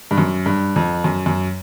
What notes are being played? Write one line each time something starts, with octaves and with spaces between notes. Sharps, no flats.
G2
F#2
G2
F2
F#2
F#2